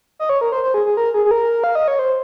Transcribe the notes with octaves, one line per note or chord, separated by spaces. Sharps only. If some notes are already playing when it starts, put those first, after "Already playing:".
D#5
C#5
A#4
C5
C5
G#4
G#4
A#4
G#4
G#4
A#4
F5
D#5
C#5
C5